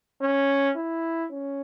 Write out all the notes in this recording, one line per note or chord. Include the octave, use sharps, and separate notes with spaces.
C#4
E4
C#4